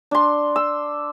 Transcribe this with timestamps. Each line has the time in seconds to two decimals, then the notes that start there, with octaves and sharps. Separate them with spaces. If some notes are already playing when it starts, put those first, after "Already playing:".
0.11 D4 C6
0.56 E6